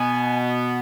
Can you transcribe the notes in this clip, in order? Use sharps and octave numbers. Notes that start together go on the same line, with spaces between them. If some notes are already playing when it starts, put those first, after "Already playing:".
Already playing: B2 B3 G#5